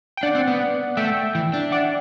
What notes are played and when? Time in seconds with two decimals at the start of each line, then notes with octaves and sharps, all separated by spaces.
0.17 G5
0.23 D4 D5 F#5
0.35 C4
0.48 B3
0.97 A3 E5 G5
1.35 E3
1.54 D4
1.72 D5 F#5